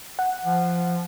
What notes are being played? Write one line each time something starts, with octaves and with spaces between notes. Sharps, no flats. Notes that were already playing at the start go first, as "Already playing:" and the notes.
F#5
F3